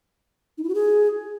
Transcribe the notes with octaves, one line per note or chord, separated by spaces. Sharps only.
D#4
E4
F#4
G#4